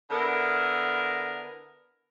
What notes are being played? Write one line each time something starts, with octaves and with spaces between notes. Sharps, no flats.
D3 B3 E4 A#4